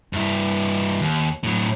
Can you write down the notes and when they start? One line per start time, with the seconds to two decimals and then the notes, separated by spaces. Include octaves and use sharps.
0.13 G2 E4
1.01 D#2
1.44 A2 F#3